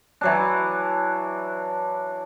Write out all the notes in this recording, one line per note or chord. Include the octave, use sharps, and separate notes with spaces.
E3 F#3 D4